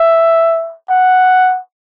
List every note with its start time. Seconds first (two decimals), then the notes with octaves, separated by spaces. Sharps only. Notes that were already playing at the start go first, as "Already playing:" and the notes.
Already playing: E5
0.90 F#5